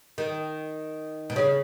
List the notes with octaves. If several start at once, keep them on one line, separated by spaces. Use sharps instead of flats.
D#3
B2
C#3